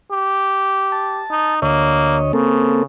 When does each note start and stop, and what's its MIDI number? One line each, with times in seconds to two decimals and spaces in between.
0.12 1.23 67
0.92 1.55 81
1.31 1.57 63
1.62 2.32 38
1.62 2.18 58
1.62 2.32 73
1.62 2.32 75
2.33 2.84 49
2.33 2.83 58
2.33 2.83 60
2.33 2.83 69